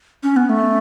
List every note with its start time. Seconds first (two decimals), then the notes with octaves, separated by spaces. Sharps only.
0.23 C#4
0.36 B3
0.49 A3